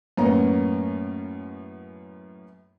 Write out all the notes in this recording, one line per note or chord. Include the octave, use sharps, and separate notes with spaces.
F#2 A2 A#3 B3 C#4 A#5